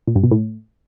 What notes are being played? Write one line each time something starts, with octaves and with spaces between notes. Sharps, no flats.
A#2
G2
B2
A2